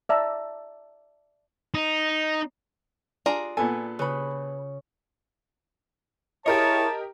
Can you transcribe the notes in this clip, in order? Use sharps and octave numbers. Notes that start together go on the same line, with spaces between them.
D5 E5 A5 A#5
D#4
D4 F4 G#4 A#5
A#2 B3 A4 G#5
C#3 B4 B5
E4 G4 G#4 A#4 C#5 D#5 A5